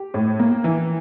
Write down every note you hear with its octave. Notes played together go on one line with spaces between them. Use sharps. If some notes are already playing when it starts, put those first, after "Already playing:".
Already playing: G4
A2
A#3
E3